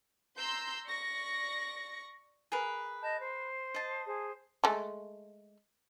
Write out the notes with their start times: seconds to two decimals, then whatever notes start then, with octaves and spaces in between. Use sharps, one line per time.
0.37 A#5 C6 E6 G6
0.88 D5 C#6 A#6
2.52 G#4 A#4 B4
3.02 D#5 A5 G6
3.19 C5
3.74 D#5 A5
4.07 G#4 C5
4.64 G#3 A3